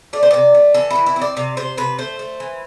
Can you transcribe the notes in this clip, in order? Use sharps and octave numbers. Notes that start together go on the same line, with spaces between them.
A3 D5
C5
C3 D5
A3
E3 A4
E3 E4
E4
C4
D5
C3 D5
C3 C5
C3 B4
A3 C5
A3
E3